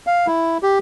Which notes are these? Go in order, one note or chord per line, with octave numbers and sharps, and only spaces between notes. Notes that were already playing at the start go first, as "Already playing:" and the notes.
F5
E4
G4